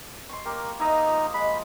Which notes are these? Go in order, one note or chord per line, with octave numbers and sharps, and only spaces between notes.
C6 C#6
A#3 G4 A#4
D#4 E4 D#5 F5
F3
G#3 B5